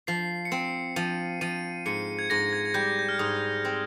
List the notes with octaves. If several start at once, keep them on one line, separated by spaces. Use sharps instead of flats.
F3 C7
C#7
C4 C7
F3 D#7
F3 D#7
G#2 C#7
G#6
G#2 A#6
G#6
G#6
G3 G6
G6
F6
G#2 D#6
C4